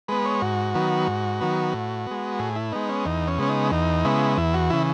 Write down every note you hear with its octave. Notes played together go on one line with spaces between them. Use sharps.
G#3 B3 B4
C#5
G#2 F#4
D#3 F#3 B3
G#2
D#3 F#3 B3
A2
G#3 B3
A2 G#4
E4
G#3 B3 D#4
C#4
E2 D#4
C#4
C#3 G#3 B3 C#4
D#4
E2 D#4
C#3 G#3 B3 E4
E2 E4
F#4
C#3 E3 E4